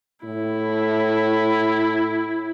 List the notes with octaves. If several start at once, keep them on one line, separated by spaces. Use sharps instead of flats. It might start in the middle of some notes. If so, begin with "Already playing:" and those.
A2 E4